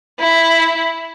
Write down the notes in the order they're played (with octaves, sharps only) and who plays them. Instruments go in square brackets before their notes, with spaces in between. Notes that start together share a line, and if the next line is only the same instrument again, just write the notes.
[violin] E4